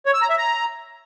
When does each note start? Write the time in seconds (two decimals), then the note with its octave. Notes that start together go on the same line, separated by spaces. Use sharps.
0.06 C#5
0.14 E6
0.22 A#5
0.30 E5
0.38 A#5